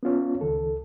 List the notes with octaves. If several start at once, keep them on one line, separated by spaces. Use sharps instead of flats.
B3 C#4 F4 C#5
C#2 D#3 A4